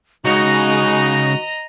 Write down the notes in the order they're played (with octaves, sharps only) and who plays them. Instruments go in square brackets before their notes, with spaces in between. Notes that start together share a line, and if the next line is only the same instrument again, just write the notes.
[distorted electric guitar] C#3 C#5 [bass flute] G#3 [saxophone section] D#4 F#4 [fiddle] D#5 A#5